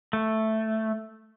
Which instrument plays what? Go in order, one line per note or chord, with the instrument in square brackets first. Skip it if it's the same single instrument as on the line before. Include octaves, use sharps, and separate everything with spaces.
[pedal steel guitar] A3